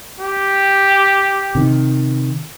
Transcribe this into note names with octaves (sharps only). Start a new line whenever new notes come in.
G4
C3 D#3